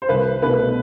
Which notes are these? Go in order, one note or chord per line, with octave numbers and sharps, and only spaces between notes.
C5
C2 B4
B2 A3 B4